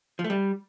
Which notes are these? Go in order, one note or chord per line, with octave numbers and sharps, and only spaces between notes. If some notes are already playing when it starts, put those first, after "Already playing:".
F3
A3
G3